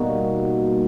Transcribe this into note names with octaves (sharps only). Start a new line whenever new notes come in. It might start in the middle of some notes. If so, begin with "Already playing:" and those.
Already playing: B2 G3 A#3 D#4 F#4